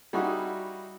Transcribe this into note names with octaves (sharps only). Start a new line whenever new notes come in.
G3 D#4 E4 F#4 G#4